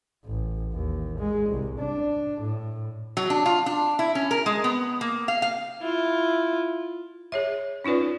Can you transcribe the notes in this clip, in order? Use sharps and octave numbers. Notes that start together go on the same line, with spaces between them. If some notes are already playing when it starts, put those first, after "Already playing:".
A1
D#2
G#3
C2
D4
A2
F#3
D4
F4
D4
E4
C#4
A#4
G#3
B3
A#3
F5
F5
E4 F4
G#4 C#5 E5
C#4 D#4 F4 B4 D5